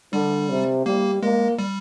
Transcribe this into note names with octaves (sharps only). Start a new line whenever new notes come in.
D3 G3
C3
G3 A#3
G#3 A#3
G3